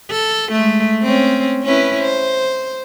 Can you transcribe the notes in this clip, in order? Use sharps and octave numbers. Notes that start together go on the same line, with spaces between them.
A4
G#3 A3
C4 C#4
C#4 E4 B4
C5